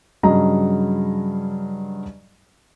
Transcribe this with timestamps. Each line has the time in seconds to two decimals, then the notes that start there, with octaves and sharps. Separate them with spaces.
0.23 G2 C#3 F#3 D#5 A#5